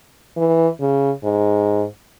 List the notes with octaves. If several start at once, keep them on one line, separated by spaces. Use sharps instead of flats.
E3
C#3
G#2